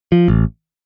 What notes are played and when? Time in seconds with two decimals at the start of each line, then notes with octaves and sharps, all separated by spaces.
0.12 F3
0.28 A1